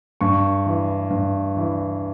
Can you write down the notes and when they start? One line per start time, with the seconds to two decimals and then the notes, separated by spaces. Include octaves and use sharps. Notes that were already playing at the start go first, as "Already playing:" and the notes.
0.21 G2 C#6
0.66 E3
1.11 G2
1.57 E3